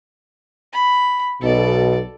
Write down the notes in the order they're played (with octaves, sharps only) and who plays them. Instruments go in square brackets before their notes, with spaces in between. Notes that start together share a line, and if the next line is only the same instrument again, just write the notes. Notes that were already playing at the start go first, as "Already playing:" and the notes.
[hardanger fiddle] B5
[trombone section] B1 B2 [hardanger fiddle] A4 D5